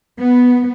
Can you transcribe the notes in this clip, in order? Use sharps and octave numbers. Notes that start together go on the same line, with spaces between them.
B3